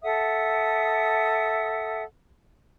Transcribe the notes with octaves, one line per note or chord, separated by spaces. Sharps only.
A4 E5 F#5 D#6